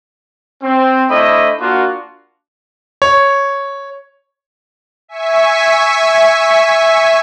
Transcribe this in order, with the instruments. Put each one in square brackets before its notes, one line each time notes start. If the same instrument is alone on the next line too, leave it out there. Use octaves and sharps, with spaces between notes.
[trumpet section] C4
A3 D4 E4 C5 D#5 B5
A#3 D4 F4 F#4
[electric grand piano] C#5
[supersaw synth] E5 G#5 C#6 B6